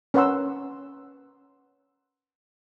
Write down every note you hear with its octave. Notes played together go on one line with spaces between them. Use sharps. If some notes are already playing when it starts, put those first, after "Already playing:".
C#4 A#4 B4 F#5 C6 E6